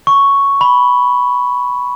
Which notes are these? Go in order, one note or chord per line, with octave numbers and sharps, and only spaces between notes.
C#6
B5